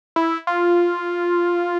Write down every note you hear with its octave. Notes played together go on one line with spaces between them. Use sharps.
E4
F4